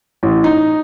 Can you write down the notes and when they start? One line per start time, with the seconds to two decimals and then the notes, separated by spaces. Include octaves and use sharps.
0.23 A1
0.44 D#4